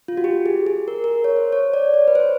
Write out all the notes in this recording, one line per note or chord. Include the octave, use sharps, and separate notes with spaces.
F4
F#4
G4
G#4
G#4
A#4
A#4
C#5
C5
C#5
D5
C#5
B4
C5